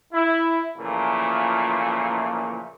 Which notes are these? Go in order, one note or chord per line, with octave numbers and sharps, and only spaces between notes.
E4
A#2 C#3 E3 F3 A3 A#3